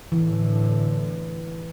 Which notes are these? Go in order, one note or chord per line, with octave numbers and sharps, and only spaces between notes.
A2 D3 E3